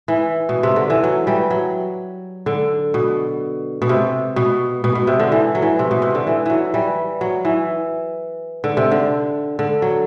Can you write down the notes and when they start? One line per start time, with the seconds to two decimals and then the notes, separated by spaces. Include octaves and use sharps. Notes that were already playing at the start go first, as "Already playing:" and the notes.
0.08 E3
0.49 B2
0.63 C3
0.76 D3
0.90 E3
1.04 F#3
1.27 E3 G3
1.51 F#3
2.46 D3
2.94 B2
3.82 B2
3.89 C3
4.36 B2
4.84 B2
4.95 B2
5.07 C3
5.20 D3
5.32 E3
5.55 F#3
5.62 E3
5.79 C3
5.91 B2
6.02 C3
6.15 D3
6.27 E3
6.46 E3 F#3
6.74 E3 G3
7.21 F#3
7.45 E3
8.64 D3
8.77 C3
8.91 D3
9.59 D3
9.82 F#3